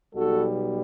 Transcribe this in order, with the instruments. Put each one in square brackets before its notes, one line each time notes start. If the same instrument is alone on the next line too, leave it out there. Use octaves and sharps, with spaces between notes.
[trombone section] B1 B2 G3 F#4 A4